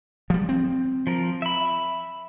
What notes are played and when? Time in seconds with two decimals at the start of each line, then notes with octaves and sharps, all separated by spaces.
0.30 F3 G3
0.49 C4
1.07 F3 A#4
1.42 E5 B5